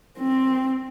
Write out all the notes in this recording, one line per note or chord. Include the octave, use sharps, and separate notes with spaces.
C4